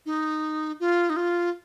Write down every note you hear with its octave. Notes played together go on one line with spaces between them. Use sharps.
D#4
F4
D#4
F4